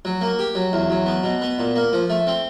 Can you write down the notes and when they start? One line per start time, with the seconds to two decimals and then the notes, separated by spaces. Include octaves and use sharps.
0.05 F#3
0.21 A#3
0.39 G4
0.55 F#3
0.73 E2
0.90 F#3
1.06 B3
1.23 B2
1.42 B3
1.59 A#2
1.76 A#3
1.93 F3
2.10 A3
2.27 C4